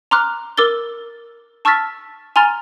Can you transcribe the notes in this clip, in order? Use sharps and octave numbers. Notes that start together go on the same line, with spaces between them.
A#5 C6 D6 F6 F#6
A#4 D6 E6 A6 G7
A5 C#6 E6 F6 A6 B6
G#5 A#5 C6 F6 A6 F7